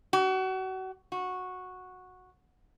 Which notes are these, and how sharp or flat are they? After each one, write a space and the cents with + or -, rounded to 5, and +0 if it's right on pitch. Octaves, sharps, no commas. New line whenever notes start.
F#4 +30
F#4 -10